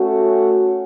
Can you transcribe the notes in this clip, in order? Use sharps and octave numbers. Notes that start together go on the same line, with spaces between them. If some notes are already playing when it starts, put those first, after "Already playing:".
Already playing: A3 C#4 F#4